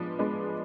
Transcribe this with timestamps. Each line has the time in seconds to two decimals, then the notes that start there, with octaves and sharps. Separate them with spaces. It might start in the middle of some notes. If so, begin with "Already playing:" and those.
Already playing: F3 G#3 B3 D4
0.19 G#3 B3 D4